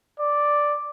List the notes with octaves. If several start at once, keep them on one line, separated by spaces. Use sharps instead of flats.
D5